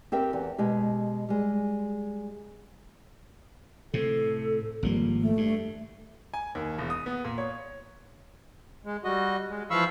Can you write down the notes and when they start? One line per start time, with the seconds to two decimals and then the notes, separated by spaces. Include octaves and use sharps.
0.12 C4 G4 A#4 E5 G5
0.33 E2
0.58 B2 G#3 G4
1.29 G3 G#3
3.94 A2 C3 A4
4.83 G#1 F3 G3 A#3
5.21 A3
5.37 G2
6.34 G#5
6.55 D#2
6.78 E1
6.90 D#6
7.06 B3
7.25 A#2
7.38 C#5
8.85 G#3
9.04 G3 F#4 D#5
9.49 G#3
9.70 E3 F3 F5 B5 C#6 E6